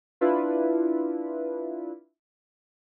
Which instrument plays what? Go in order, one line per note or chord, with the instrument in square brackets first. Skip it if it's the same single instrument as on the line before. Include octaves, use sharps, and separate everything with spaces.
[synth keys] D4 E4 F4 B4